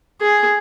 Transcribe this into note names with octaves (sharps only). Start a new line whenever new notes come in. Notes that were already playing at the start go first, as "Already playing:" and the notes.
G#4